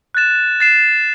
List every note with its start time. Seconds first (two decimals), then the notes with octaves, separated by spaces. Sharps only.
0.15 F#6 A6 E7
0.60 A6 C7 E7